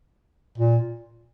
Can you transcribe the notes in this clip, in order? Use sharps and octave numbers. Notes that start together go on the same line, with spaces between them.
A#2